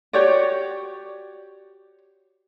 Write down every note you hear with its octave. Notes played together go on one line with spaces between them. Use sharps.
F#4 G4 C#5 D5